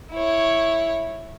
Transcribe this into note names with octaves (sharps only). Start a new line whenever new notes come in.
E4 C#5